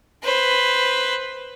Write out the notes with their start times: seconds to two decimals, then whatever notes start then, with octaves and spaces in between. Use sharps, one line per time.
0.23 B4 C5